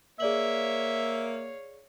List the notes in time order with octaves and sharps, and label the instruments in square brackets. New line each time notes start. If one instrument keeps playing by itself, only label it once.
[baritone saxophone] A#3 [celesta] G#4 D5 F#7 [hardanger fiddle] C#5 F5 [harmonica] E5